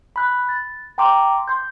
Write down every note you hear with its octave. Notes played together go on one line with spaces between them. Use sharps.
B5 F#6
A6
G5 A#5 C6 D6
C6 G6